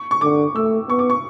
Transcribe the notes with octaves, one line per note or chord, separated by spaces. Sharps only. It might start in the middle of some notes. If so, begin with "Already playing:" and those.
Already playing: C#6
C#6
D3 D6
A3 E6
B3 C#6
D6
C#6